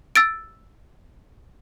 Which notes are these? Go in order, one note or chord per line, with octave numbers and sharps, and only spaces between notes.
E6 A6 D7